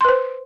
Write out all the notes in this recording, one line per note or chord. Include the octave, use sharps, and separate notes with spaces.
B4 C5 C6